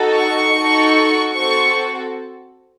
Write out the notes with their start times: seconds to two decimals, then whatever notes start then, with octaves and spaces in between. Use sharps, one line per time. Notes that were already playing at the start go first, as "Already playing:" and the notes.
Already playing: D#4 F#4 A4
0.15 C#6
0.54 D#4 F#4 A4
1.33 C4 F#4 A4 C#6